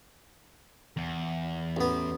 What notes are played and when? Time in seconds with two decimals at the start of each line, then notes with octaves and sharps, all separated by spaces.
0.97 E2
1.77 A1 B3